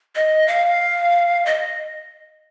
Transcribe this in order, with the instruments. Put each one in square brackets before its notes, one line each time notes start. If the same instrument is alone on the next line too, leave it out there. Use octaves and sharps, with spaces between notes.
[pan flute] D#5
F5
D#5